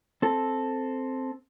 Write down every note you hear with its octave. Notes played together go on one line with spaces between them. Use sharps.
C4 A4